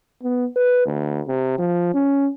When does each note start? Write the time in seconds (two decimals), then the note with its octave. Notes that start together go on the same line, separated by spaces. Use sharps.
0.23 B3
0.56 B4
0.86 D2
1.28 C3
1.59 F3
1.94 C#4